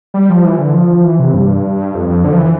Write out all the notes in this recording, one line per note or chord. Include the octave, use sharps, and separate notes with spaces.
G3
F3
E3
D3
F3
E3
C3
G2
F2
F2
D3
F3
E3